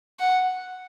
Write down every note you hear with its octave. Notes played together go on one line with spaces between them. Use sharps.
F#5